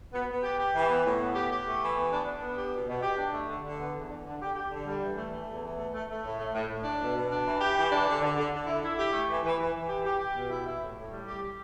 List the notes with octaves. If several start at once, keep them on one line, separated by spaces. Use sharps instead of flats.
B3
B3
G4
G4
E3
B3
A2
B3
G4
G4
A3
E3
B3
D4
D4
B3
G4
B2
B2
G4
D4
A3
D3
D3
B3
E2
D3
D3
G4
G4
D3
G3
E3
A3
A3
E2
E3
A3
A3
A3
A2
A3
A2
A2
D4
B2
B2
D4
E3
G4
E3
D4
D3
D3
D3
D3
E4
E4
G4
A3
E3
E3
E3
E3
G4
G4
G4
B2
E4
E4
A2
A2
G3
G4
G4